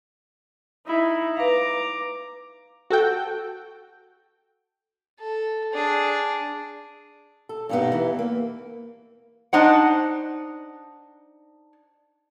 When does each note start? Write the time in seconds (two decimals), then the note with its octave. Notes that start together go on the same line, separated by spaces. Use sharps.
0.86 D#4 E4
1.37 B4 F5 A#5 D6
2.90 F#4 A4 G5
5.20 A4
5.73 D4 G#4
7.49 A4
7.69 G2 B2 G3 A3 B3 D#4
7.92 E2 E3
8.19 A#3 B4
9.53 D4 D#4 C5 F#5